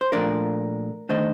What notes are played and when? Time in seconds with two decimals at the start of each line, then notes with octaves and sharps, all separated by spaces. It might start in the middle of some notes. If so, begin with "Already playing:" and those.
0.01 C5
0.12 A#2 F3 A3 D4 A#4 D5
1.09 D#3 A3 D4 C5 D#5